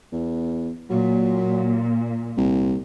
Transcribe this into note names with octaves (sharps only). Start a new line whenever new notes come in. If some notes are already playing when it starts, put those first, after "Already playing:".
E2
A#2 F#3
C2